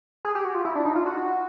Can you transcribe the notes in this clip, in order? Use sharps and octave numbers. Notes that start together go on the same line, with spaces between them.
G#4
G4
F#4
F4
E4
D4
D#4
F4
F#4